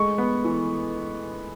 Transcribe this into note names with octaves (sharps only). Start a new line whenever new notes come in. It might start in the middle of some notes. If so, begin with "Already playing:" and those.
Already playing: G#3 A3 C#6
B3
E3